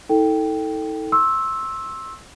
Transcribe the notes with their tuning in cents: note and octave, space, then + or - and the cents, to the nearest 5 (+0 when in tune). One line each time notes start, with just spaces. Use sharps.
D#4 +45 A4 +5 G5 +0
C6 +35 E6 -5